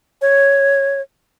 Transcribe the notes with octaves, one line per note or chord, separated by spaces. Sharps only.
C#5